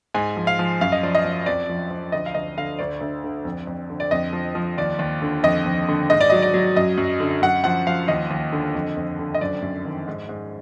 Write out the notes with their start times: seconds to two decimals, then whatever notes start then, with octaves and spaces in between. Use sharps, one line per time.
0.14 G#2 G#5
0.37 F3
0.47 F5
0.59 F3
0.81 F#2 F5
0.92 D#5
1.03 F3 D5
1.15 D#5
1.25 F3
1.46 F2 D5
1.69 F3
1.91 F3
2.12 D2 D#5
2.26 F5
2.34 D2 D#5
2.57 D3 F5
2.79 D2 D5
3.01 D2
3.24 D3
3.45 F2
3.67 F2
3.90 D3
4.00 D5
4.11 F2 D#5
4.33 F3
4.55 F3
4.78 D#2 D5
4.99 D#2
5.22 D3
5.43 F2 D#5
5.66 F2
5.89 D3
6.10 G#2 D#5
6.21 D5
6.30 F#3 D#5
6.42 D5
6.54 F#3
6.76 F#2 D#5
6.98 F#2
7.20 D3
7.42 F#2 F#5
7.64 F3 F#5
7.87 F3 F5
8.08 D#2 D#5
8.31 D#2
8.52 D3
8.75 F2
8.97 F2
9.19 D3
9.34 D#5
9.41 F#2 D5
9.62 F#2
9.85 D#3
10.08 G#2
10.29 G#2